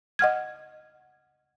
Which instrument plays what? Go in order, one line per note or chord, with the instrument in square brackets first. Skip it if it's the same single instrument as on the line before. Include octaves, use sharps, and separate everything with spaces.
[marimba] D#5 F#5 F6 G#6